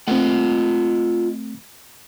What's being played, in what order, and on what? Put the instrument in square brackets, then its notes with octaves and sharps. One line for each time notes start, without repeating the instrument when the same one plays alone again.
[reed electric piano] A3 C4 [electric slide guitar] F4 D#5 F#5